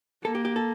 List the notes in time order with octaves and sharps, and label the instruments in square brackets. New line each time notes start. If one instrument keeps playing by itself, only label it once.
[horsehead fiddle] A#3 [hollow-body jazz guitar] A4
[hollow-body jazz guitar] G4
G4
A4